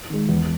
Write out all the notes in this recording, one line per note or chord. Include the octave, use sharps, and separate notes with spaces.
D#3 G#3
E2